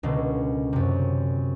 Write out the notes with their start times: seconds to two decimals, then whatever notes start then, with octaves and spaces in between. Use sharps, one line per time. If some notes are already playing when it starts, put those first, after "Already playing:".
0.03 C#2 B2 D3 A#3
0.73 F#2 C3